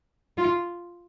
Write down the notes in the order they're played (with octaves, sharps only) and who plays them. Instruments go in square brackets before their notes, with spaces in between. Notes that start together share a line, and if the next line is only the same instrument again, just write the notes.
[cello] F4